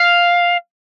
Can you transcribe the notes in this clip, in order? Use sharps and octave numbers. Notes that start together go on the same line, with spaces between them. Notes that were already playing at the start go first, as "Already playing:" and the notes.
Already playing: F5